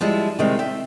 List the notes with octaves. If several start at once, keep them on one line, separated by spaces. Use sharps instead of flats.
F3 G3 G#3 E4
C3 D#3 G3 G#3 C4
E5 G5